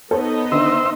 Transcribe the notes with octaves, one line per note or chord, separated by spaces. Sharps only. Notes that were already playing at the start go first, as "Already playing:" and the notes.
B3 D#4 A4 C5 C#5 D#5
D3 D#3 D4 C5 E5